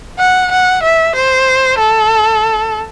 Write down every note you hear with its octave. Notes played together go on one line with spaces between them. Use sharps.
F#5
F#5
E5
C5
A4